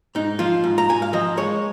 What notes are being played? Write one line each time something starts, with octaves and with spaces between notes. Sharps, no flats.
G#2 D#4
F3 F4
G#2
A#5
G#2 G#5
F5
F3 D#5
G#3 C#5